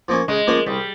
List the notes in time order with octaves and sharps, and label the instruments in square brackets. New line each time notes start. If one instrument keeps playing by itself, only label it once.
[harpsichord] F3 A#3 C#4
[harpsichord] C#3 [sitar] G#3
[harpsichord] F3 A#3 C#4
[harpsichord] C2 [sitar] G3